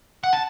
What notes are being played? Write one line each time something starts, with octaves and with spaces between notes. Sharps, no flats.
F#5
A5